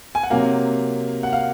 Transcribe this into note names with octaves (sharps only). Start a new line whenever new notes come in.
G#5
F#5
C3 F#3 A#3 F5
F#5
F5